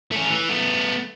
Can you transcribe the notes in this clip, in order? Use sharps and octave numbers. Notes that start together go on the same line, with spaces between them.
A3 C#4
E3
A3 B3